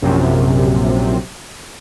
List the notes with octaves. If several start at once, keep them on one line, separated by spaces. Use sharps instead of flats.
A#1 F#2 C3